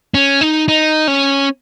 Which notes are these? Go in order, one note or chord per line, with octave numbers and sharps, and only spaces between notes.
C#4
D#4
D#4
C#4